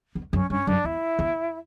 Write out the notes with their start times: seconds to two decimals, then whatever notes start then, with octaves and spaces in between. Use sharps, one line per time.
0.15 E2
0.33 F#2 C#4
0.50 G2 C#4
0.67 F#2 D4
0.84 E2 E4
1.19 E2